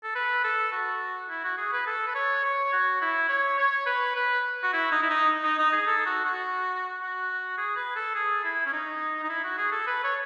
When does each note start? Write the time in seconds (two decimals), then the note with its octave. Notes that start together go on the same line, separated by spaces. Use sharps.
0.03 A4
0.15 B4
0.44 A4
0.72 F#4
1.30 E4
1.44 F#4
1.57 G#4
1.72 B4
1.87 A4
2.07 B4
2.15 C#5
2.44 C#5
2.72 F#4
3.01 E4
3.29 C#5
3.59 C#5
3.86 B4
4.16 B4
4.63 F#4
4.73 E4
4.92 D#4
5.02 E4
5.10 D#4
5.43 D#4
5.59 D#4
5.72 G#4
5.86 A4
6.06 F#4
6.25 F#4
7.01 F#4
7.57 G#4
7.77 B4
7.96 A4
8.15 G#4
8.44 E4
8.66 C#4
8.73 D#4
9.23 D#4
9.29 E4
9.44 F#4
9.57 G#4
9.72 A4
9.86 B4
10.04 C#5